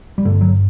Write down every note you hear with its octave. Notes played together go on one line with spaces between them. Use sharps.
G3
G1 G2 D3 A3
F#3